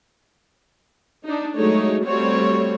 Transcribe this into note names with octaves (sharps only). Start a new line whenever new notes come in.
D4 D#4
F#3 G#3 A3 D#4 C#5
G3 A3 C4 F#4 C#5